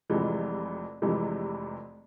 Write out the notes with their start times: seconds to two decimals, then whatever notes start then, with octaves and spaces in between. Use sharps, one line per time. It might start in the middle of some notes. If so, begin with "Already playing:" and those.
0.10 F1 F2 C3 E3 G#3
1.02 F1 F2 C3 E3 G#3